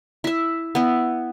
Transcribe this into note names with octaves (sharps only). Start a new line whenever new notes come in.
E4 E5
B3 E4